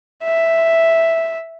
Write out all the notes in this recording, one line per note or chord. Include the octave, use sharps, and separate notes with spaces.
E5